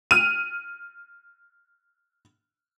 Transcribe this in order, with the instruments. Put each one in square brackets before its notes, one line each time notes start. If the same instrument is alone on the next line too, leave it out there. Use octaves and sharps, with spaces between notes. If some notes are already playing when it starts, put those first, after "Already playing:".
[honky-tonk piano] F6 D#7